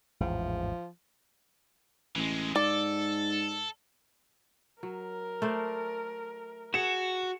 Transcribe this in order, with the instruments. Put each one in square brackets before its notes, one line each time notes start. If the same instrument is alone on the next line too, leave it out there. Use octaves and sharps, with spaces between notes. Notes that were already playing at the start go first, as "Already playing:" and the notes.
[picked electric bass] A1 E2 G#2 [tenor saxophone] F3
[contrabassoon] A1 [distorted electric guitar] E3 G#3
[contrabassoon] G#2 [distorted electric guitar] A4 [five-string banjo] D5
[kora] F#3 [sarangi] A#4
[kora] A3 C5 D5
[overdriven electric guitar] F#4 [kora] G#4 [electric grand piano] C#7 E7